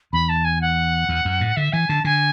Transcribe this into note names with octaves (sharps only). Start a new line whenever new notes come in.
E2 B5
A5
G#5
F#5
E2
F#2
A2
D3 E5
E3 G#5
D3 A5
D3 G#5